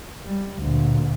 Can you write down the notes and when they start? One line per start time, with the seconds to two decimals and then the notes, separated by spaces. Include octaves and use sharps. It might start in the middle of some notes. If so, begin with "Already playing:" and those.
0.25 G3
0.59 D2 A#2